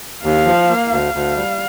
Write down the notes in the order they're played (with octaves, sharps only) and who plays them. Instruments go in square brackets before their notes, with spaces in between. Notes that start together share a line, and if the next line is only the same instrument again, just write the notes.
[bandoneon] D#2 [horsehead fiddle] F5
[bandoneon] F3
A#3
[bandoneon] D2 [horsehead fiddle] F5
[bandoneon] D2
G3